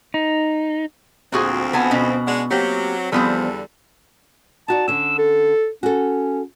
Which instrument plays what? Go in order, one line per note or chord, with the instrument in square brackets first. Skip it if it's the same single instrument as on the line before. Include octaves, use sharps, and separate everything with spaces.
[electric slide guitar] D#4
[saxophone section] D2 F3 C4 [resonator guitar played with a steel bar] A#2 F#4 G#4
[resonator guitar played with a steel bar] B3 G#5 A5
B2 C#4
[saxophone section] G#3 D4 F#5
[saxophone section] F#3 C4 [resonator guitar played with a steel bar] A#3 G4
[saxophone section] E2 D3 G3 [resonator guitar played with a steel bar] F3 B3 C4
[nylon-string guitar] D#4 F#4 D5 [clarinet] A5
[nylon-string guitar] D3 C#4 [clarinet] E6
[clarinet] A4
[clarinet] C#4 [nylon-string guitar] F#4 A4